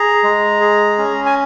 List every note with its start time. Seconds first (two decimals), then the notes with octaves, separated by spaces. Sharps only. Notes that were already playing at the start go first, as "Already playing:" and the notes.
Already playing: G#4 A#5
0.23 G#3
0.61 G#4
0.98 C#4
1.26 G#5